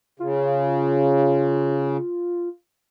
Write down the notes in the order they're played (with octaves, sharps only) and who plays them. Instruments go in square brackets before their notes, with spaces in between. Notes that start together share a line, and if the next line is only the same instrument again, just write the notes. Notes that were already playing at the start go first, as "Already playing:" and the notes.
[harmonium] C#3 [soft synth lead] F4